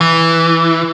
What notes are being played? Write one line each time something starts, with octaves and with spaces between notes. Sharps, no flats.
E3